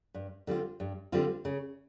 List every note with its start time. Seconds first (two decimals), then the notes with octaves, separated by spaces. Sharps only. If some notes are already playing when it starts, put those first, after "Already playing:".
0.14 G2
0.47 D3 G3 C4 F4
0.80 G2
1.12 D3 G3 C4 F4
1.45 C#3